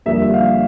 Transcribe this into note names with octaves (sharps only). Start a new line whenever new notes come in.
F2 D3 G3 A#3 E5
F5